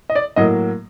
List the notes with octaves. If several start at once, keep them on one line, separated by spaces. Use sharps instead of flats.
D#5
D5
A2 F#3 A#3 D#5